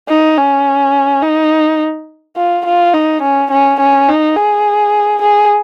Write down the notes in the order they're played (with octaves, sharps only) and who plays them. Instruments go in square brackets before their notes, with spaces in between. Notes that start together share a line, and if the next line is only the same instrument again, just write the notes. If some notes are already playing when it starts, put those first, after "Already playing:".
[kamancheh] D#4
C#4
D#4
F4
F4
D#4
C#4
C#4
C#4
D#4
G#4
G#4